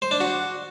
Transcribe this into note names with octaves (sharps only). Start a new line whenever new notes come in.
C5
D4
F#4